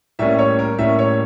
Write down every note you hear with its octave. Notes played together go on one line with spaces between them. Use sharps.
A2 G3 A#3 C#4 E5
C#5
A#4
A2 G3 A#3 C#4 E5
C#5